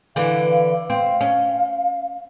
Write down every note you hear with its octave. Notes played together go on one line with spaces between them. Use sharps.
D3 E3 F5
C4 F5
C#4